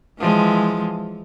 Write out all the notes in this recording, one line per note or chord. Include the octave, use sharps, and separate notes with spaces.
E3 F3 G#3